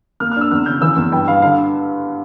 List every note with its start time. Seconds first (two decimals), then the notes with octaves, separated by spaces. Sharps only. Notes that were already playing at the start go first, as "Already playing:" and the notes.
0.20 A#3 F6
0.32 F6
0.36 D4
0.41 E6
0.51 E2 F6
0.66 C#3 G6
0.81 E3 E6
0.96 E2
1.12 G2 G5
1.27 G2 F5
1.42 D3 F5